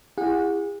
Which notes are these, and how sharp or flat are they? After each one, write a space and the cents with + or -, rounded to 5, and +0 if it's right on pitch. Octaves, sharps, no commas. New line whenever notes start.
E4 +15 G#4 -40 F#5 -30